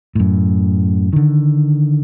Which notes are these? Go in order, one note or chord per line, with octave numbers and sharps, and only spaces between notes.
F#2 A2
D3 D#3